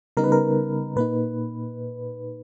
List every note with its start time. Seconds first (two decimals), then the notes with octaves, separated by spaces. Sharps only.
0.17 C#3 G3 B3 D#4 A#4
0.24 B4
0.32 A#4
0.96 A#2 A#3 D#4 B4